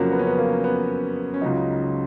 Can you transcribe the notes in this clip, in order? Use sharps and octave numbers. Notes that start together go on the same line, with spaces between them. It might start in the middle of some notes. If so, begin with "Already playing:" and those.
Already playing: F2 C#3 F#3 A#3
B3
C#4
B3
A#3
B3
C#4
C#2 C#3 F#3 D#4